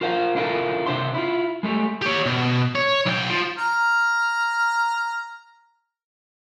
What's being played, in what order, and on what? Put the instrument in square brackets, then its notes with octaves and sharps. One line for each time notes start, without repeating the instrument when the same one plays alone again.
[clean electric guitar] F4 A#4 C5 F5
D4 E4 F4 A4 A#4
C3 D4 C5 E5 C6
E4 F4
G#3 A3 G4
[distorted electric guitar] G4 C#5
B2
C#5
B1 G5
F3
[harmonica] A#5 F6